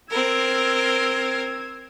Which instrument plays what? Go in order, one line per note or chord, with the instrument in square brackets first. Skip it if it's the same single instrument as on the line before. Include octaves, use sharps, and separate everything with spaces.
[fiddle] C4 A#4 [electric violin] E6 G#6